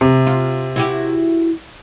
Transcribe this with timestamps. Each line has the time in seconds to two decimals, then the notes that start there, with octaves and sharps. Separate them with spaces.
0.01 C3
0.27 F4
0.76 E4 F#4 G4